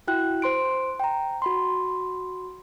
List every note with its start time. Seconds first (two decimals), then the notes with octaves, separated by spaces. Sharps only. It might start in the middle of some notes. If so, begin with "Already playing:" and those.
0.08 E4 F#4 G5 F#6
0.42 C5 C6 D7
1.00 G5 A#5
1.42 F#4 B5 C6